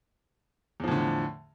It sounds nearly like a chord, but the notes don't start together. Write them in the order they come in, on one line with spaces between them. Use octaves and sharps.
E2 F3 A2 D3